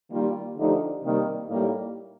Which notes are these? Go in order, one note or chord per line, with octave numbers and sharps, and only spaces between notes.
D#3 G3 A#3 F4
D3 F3 A3 D#4 G4
C3 D#3 G3 A#3
A2 G3 A#3 D#4